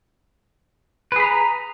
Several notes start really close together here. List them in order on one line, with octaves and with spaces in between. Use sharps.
B4 G#4 B5 A#5